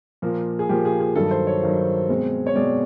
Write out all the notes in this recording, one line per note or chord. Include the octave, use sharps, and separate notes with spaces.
A#2 F3 A#3
G#4
A#2 F3 A#3 G4
G#4
G#4
G2 D#3 F#3 A4
C5
C#5
G2 D#3 F#3
B2 G#3 C4
C#5
B2 G#3 C4 D5